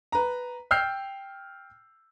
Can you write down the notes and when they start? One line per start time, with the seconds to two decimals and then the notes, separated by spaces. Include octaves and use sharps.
0.12 B4 A#5
0.71 G5 E6 F6 G6 C7